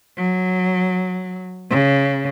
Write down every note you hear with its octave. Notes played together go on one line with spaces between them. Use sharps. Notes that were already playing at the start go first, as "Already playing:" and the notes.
F#3
C#3